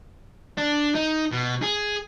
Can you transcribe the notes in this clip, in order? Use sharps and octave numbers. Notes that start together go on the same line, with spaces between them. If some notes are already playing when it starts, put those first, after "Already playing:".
D4
D#4
B2
G#4